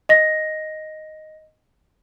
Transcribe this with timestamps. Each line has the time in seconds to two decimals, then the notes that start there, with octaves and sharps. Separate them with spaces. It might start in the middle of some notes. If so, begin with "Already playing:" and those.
0.09 D#5 A#6